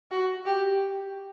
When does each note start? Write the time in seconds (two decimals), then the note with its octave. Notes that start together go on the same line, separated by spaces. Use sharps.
0.11 F#4
0.46 G4